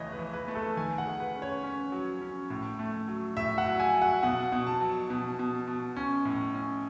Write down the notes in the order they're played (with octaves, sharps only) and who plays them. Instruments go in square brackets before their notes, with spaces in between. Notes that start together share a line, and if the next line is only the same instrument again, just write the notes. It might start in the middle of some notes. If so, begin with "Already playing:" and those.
Already playing: [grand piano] C#2 E3 A3 [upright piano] C#5 D#5
[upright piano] B4
[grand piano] E3
[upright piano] B4
[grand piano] A3
[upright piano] A4
[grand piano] D#3 [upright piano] G#5
[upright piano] F#5
[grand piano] G#4
[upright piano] B4
[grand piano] C#4
[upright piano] C#5
[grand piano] C#4
F#3
C#4
A2
A3
F#3
[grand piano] A2 [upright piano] E5
[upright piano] F#5
[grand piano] F#3
[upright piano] G#5
[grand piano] F#3
[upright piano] F#5
[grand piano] B2 [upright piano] F#5
[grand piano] B2
[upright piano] A5
[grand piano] F#3
B2
B2
B2
C#4
A2
C#4